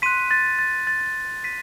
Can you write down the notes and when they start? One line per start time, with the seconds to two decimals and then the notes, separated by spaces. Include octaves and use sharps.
0.02 C6 F#6 B6 D#7
0.31 A6
0.59 A6
0.87 A6
1.44 B6 D#7